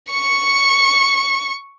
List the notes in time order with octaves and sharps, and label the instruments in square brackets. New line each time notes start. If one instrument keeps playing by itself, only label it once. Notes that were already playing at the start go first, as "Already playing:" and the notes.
[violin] C#6 C#7